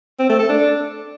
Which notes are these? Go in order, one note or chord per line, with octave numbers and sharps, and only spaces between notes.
C4
A3
A4
D4